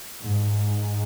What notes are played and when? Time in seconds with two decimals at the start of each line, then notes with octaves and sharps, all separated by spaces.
0.22 G#2